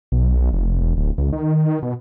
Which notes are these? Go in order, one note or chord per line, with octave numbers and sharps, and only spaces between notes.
B1
F1
E1
D1
C#2
D#3
B2